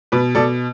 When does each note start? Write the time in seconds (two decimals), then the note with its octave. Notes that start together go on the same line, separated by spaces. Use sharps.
0.12 B2 B4
0.35 B2 A4 D5